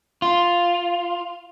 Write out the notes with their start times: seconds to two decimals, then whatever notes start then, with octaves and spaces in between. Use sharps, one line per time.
0.22 F4